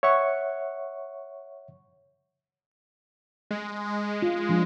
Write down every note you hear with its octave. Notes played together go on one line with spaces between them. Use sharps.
C#5 E5 F#5 C#6
G#3
F4
F3 D4